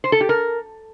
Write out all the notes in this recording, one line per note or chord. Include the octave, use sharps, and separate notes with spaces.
C5
A4
G4
A#4